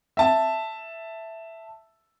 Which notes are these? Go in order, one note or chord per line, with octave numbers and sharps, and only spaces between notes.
E5 A5